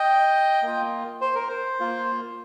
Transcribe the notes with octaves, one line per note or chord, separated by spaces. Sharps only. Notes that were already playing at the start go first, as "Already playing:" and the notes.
Already playing: D#5 G5
A#3 F4
C5
A#4
C5
A#3 F4